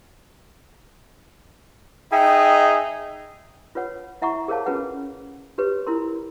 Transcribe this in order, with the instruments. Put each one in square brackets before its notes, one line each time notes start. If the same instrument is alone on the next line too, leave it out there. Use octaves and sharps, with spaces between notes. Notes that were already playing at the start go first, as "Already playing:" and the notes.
[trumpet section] D#4 G#4 E5 [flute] G5
[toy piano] F4 B4 C#5 F#5
E4 E5 F#5 A#5 C#6
G#4 A#4 C5 C#5 F5 A5
C#4 F4 G#4 B4 F#5
F#4 G4 B4 C#5
E4 F4 A#4 C6